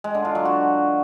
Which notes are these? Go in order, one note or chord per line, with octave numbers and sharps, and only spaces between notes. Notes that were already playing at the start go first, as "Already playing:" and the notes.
G#3
D3
F4
F#3
F#4